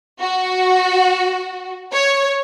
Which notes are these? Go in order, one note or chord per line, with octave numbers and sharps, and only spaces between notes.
F#4
C#5